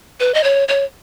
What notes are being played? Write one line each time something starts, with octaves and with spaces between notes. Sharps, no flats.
B4
D#5
C#5
C#5